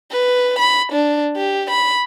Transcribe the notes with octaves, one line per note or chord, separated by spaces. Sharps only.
B4
B5
D4
G4
B5